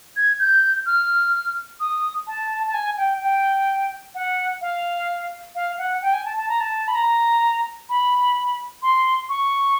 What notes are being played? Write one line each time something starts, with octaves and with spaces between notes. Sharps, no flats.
G#6
G6
F6
D#6
A5
A5
G#5
G5
G5
F#5
F5
F5
F#5
G5
G#5
A5
A5
A#5
A5
B5
A#5
B5
C6
C#6